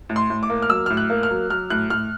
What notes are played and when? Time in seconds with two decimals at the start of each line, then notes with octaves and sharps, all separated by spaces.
0.09 A2
0.16 C6
0.30 A2
0.43 D6
0.50 A#3
0.62 F6
0.70 F#3 E6
0.86 A2 F6
0.97 F#6
1.10 A#3
1.23 F6
1.30 F#3
1.50 F#3 F6
1.70 A2 F#6
1.90 A2 F6